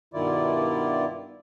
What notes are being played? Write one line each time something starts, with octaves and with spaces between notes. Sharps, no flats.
G2 B2 D#3 E4 F4 D5